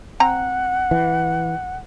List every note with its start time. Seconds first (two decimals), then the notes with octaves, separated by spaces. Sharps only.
0.20 C4 F#5 A#5
0.91 E3